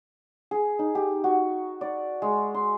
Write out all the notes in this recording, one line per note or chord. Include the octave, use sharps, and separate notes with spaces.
G#4
D#4
G4
F#4
D5
G#3
C6